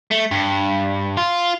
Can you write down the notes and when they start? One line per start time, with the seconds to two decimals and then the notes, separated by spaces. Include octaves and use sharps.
0.11 A3
0.31 G2
1.17 F4